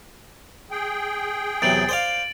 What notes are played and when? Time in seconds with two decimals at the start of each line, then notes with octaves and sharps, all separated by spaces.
0.71 G#4 G5
1.62 E2 C3 F#3 A6 D7 F#7
1.89 C5 D5 F5